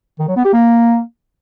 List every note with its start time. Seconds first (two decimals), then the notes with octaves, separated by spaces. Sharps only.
0.19 D#3
0.28 F#3
0.36 B3
0.45 G4
0.53 A#3